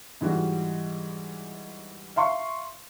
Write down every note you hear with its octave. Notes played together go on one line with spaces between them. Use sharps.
G#2 E3 G3 F#4
E5 F5 C6 C#6